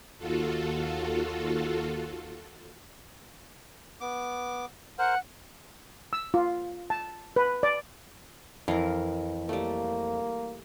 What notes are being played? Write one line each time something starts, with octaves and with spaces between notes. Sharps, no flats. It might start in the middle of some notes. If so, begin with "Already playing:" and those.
D#2 F4 F#4 A4
B3 D6
A#4 C5 F#5
E6
F4
A5
B4
D5
F2 E3 A#4 F5
G3 A3 A#3